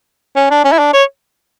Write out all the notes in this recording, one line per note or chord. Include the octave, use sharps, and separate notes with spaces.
C#4
D4
C#4
E4
D4
C#5